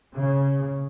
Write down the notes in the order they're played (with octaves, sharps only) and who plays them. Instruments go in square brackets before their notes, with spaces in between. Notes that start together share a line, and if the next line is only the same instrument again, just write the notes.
[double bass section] C#3